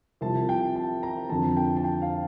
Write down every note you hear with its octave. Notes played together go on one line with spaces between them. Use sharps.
C2 C3 F3 A5
G5
A5
A#5
F2 D3 F3 A5
G5
A5
G5
F5